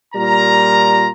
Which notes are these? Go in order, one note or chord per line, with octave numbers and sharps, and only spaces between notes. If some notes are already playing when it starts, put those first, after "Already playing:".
A#2 G3 F4 A#4 A#5